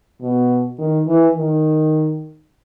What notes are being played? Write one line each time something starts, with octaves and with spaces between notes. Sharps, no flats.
B2
D#3
E3
D#3